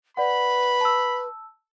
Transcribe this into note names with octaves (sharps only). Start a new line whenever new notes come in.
B4 D5 F#5 B5
A5 E6